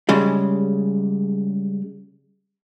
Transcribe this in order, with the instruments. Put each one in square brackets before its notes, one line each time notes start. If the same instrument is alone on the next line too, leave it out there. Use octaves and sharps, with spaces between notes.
[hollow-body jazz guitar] C#3 G3 G#3